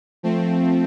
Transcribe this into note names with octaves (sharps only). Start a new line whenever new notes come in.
F3 A3 C4